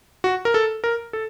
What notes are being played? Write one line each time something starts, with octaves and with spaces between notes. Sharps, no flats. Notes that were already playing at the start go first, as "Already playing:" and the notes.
F#4
A#4
A4
A#4
A4